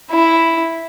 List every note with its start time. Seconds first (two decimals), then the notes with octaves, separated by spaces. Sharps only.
0.11 E4